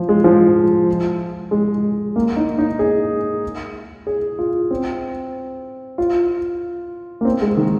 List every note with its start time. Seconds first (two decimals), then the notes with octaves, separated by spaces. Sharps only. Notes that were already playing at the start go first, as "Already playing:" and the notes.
Already playing: F3
0.09 G#3
0.24 F3
1.51 G#3
2.16 A#3
2.36 D#4
2.59 D#4
2.79 G#4
4.07 G#4
4.39 F4
4.71 C4
5.98 F4
7.21 A#3
7.25 C4
7.42 G#3
7.57 D#3